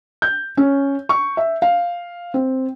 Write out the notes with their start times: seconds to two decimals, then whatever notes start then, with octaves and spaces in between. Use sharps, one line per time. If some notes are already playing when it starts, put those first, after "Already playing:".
0.22 G6
0.57 C#4
1.09 C#6
1.37 E5
1.62 F5
2.34 C4